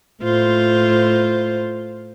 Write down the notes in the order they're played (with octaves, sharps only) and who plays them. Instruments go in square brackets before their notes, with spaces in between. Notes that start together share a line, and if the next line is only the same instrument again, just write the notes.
[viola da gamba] A2 F4 C5